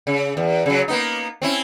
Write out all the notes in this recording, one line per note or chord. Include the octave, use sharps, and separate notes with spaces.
C#3
E2
C#3 F#3
A#3 B3 D#4
C4 C#4 E4